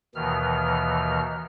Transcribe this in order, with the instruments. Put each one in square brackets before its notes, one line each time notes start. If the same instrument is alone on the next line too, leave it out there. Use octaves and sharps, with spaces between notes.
[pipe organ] D#2 B2 D#3 E3 F6